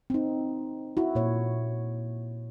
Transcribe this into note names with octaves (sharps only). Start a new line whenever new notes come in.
C4 D#4
E4 F#4
A#2 C#5